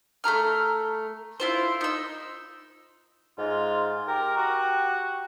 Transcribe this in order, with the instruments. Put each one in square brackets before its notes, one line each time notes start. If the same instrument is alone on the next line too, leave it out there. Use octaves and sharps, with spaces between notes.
[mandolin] A3 G#4 A#5 F6
E4 F4 C5
D#4 E6
[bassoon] G#2 [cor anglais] F4
[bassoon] G4 [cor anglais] A#4
[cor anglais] F#4